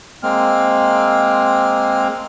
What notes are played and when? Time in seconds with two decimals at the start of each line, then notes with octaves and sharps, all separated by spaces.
0.23 G#3 A#3 C4 F6